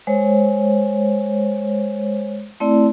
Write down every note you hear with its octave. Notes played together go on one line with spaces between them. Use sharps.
G#3 C5 C#5
A3 C4 E4 D5